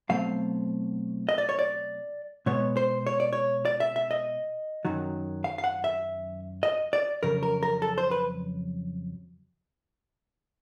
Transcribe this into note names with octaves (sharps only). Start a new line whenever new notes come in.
B2 F#3 A3 C4 F5
D#5
D5
C#5
D5
B2 G#3 B3 C#5
C5
C#5
D5
C#5
D5
E5
E5
D#5
F#2 D#3 F#3
F5
F5
F#5
E5
D#5
D5
F2 C#3 F#3 A#4
A#4
A#4
A4
C5
B4